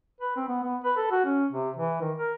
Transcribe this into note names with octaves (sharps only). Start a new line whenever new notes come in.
B4
C4
B3
B3
B4
A4
F#4
C#4
C3
E3
D#3
A#4